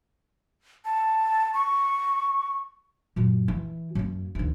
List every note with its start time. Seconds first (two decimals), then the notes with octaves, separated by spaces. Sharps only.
0.85 A5
1.54 C#6
3.16 F#2 A#2
3.48 E3
3.95 F#2 A#3
4.35 D2 D#3